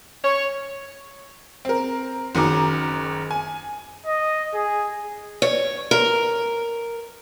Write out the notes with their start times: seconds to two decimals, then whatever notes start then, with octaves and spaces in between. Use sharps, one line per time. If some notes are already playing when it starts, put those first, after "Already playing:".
0.24 C#5
1.65 C4 A#4
2.35 F#1 D#3 C#4 F#4 A#5 D6
3.31 G#5
4.06 D#5
4.54 G#4
5.42 C#5
5.91 A#4